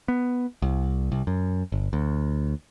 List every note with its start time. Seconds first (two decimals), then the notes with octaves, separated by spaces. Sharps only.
0.08 B3
0.62 C2
1.12 C2
1.27 F#2
1.72 G1
1.93 D2